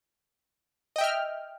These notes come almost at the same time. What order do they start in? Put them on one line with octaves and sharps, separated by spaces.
D#5 G5 E5 F6